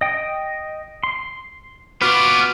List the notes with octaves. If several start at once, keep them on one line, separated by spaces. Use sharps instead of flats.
D#5 G5
C6
B3 F4 F#4 B4 D6 F6